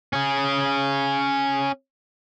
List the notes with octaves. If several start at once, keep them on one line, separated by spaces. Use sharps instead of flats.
C#4 G#4